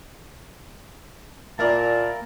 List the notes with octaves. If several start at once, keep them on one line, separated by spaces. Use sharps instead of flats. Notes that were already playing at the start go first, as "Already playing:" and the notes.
A#2 A#3 E4 A#4 D5 A5